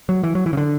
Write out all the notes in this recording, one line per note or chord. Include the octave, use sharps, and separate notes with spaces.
F#3
E3
F#3
E3
C#3
D3